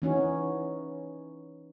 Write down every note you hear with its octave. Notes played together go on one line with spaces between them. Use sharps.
E3 C#4 D#4 F#4